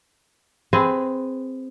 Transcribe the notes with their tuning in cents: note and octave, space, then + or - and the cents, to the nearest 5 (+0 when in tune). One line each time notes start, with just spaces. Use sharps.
C4 +0 G#4 +0 B4 +20